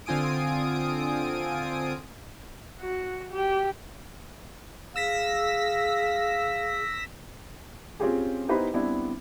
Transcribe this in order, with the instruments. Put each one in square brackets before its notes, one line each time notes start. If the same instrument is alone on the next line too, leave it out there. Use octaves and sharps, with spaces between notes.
[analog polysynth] D3 C4 F4 G#5 D#6 D7
[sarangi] F#4
G4
[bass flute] G#4 [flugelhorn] F5 [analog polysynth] E6 A#6 B6
[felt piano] C4 C#4 F4 G4 G#4
B3 D#4 E4 G4 B4 C5
G3 B3 C4 D4 E4